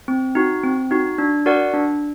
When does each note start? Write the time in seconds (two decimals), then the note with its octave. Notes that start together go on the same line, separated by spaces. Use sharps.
0.08 C4
0.35 D#4 F#4
0.64 C4
0.91 D#4 F#4
1.18 D4
1.46 F#4 A#4 D5 F#5
1.73 D4